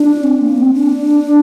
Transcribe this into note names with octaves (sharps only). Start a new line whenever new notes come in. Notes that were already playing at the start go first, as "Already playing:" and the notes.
Already playing: D4
C4
A#3
C4
D4